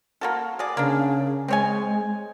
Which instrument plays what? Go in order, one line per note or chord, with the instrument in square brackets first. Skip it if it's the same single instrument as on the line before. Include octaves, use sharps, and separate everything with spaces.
[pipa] A#3 F#4 A4
F#4 G#4 D5
[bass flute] C#3 [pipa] A#3 D4
[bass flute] G#3 [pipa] C4 C#5 G#5